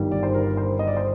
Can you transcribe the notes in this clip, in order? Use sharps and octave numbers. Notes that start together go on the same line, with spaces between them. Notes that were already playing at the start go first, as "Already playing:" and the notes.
Already playing: G1 G2 D#3 G3
D5
C5
A#4
C5
D#5
D5
C5